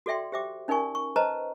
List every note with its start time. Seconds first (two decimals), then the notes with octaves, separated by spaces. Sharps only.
0.06 F#4 A4 D5 E5 G5 C6
0.32 G4 C5 E5 G5 D6
0.68 C#4 D#4 A#4 D5 G#5 C#6
0.95 C#6
1.16 B4 C5 D#5 A5 A#5